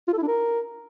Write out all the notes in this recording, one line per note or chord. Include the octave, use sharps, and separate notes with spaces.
F4
A4
E4
D4
A#4